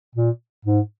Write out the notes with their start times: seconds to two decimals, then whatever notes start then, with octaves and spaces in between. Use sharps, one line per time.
0.15 A#2
0.65 G#2